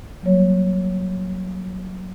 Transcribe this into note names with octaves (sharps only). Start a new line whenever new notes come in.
F#3 G3 A#3 C#5